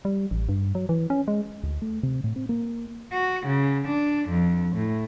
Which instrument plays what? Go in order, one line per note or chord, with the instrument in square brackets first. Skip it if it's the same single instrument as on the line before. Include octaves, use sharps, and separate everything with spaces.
[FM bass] G3
A1
G2
F#3
E3
C#4
G#3
[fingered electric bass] D2
A3
C3
A2
C4
A#3
[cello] F#4
C#3
D4
F2
A2